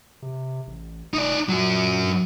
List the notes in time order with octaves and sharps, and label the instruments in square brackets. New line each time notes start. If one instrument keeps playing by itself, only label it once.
[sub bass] C3
A1
[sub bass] F1 [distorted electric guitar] D#4 D5
[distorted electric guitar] F#2 F#3 [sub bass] A#2
[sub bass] G2